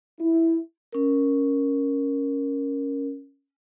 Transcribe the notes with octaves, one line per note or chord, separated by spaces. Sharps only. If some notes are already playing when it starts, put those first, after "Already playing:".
E4
C#4 A#4